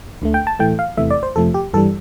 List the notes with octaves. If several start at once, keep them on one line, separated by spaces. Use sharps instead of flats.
D2 D3 A3
G5
A5
A2 E3 A3 G5
F5
E2 C3 E3 A3 E5
D5
C5
F2 C3 F3 A3 A4
G4
G2 E3 G3 A4